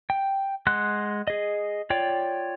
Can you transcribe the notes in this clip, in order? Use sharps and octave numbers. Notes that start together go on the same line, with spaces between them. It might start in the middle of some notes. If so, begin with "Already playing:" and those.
G5
G#3 F#5 C6 F#6
G#4 D#5
F4 C#5 D5 G5